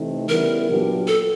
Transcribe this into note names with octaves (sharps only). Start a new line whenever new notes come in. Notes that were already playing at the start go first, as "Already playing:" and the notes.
Already playing: C3 E3 A3 C4 D#4
C#3 E3 G3 B3 E4 A#4
A#2 F#3 B3 D4 G4
A4